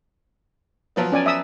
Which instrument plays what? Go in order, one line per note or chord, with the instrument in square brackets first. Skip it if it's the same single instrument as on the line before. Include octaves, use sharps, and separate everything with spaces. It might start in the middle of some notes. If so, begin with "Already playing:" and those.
[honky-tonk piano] F3 F#3 B3
[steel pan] C#4 D5 G#5
E5 D#6 E6